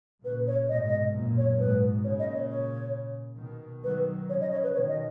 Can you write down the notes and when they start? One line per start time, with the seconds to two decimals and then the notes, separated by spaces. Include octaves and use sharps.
0.24 A#2 C#3 B4
0.47 C#5
0.69 G#2 B2 D#5
0.86 D#5
1.14 F#2 A#2
1.37 C#5
1.59 G#2 B2 B4
2.04 A#2 C#3 C#5
2.19 D#5
2.34 C#5
2.49 C#5
3.38 B2 D#3
3.83 D#3 F#3 B4
4.29 C#3 F3 C#5
4.41 D#5
4.52 C#5
4.63 B4
4.74 B2 D#3 C#5
4.88 D#5